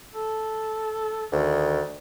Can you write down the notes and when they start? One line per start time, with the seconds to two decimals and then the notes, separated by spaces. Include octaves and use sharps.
0.15 A4
1.32 D2 D#3